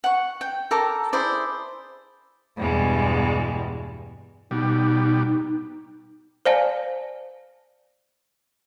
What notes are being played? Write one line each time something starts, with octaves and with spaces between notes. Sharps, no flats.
F#5 C#6
G5
A4 A#4 A#5 D6
E4 G#4 C5 D5
E2 G2 B2 G3 G#3
B2 G3 D#4
C5 D5 F5 G#5 A5